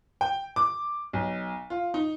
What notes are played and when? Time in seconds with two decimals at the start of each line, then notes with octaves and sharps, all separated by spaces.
0.21 G5
0.56 D6
1.13 B1
1.70 F4
1.94 D#4